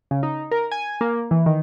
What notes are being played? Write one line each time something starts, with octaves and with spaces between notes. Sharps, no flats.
C#3
D#4
A#4
G#5
A#3
E3
D#3